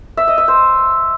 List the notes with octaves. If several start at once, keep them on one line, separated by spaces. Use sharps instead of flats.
E5
D#5
E5
C5